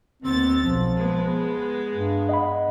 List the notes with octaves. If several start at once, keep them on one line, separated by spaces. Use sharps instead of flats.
D#2 B3 C4 A6
B1 F3
G#3 B3
G2
D#5 F#5 B5